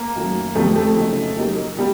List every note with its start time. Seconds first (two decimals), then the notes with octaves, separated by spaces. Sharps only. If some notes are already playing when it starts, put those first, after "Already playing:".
Already playing: A#3
0.15 F#2 D#3 F#3 A3
0.55 F2 D3 G3 A3 B3
0.75 A3
0.96 C#3 F#3 A#3 D#4
1.37 F#3 A#3 D#4 G4 A#4
1.77 B2 G3